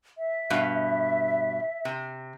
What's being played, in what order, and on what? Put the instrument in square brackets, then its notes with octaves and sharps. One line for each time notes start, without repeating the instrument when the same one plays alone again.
[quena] E5
[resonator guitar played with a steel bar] G2 B2
C3